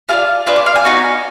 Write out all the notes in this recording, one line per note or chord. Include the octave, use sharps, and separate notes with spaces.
D4 F4 G#4 F5
D4 F4 G#4 B4
D5
F5
G#5
B3 D#4 F#4